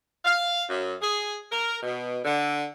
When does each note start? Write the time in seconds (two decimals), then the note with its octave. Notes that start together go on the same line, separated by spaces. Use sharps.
0.24 F5
0.69 F#2
1.00 G#4
1.51 A#4
1.83 B2
2.24 D3